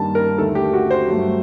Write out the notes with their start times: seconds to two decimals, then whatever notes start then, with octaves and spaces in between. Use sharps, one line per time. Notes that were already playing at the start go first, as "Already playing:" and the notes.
Already playing: G2 D#3 G3 A#3 A5
0.15 A#4
0.38 D#2 D3 A3 A4
0.55 G4
0.73 F#4
0.91 C5
1.08 G2 F#3 A3